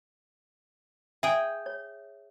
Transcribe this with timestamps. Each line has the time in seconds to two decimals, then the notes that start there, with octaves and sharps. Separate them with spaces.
1.23 G#4 E5 G5
1.66 C#5